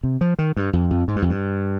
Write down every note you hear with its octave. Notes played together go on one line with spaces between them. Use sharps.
C3
F3
D#3
G2
F2
F2
G#2
G2
F2
G2